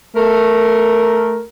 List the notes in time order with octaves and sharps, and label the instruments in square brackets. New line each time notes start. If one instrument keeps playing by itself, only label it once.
[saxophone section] A3 A#4